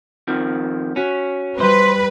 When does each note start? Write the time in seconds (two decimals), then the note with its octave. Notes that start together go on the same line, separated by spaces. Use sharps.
0.28 F2 D#3 F3
0.96 C#4 F#4 B6
1.60 G3 B4 C5 E5